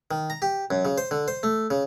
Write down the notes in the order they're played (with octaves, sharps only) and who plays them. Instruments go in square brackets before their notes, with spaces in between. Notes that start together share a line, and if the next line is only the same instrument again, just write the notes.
[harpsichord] D#3
A#5
G4
F#2
C#3
C5
D3
C5
A3
C#3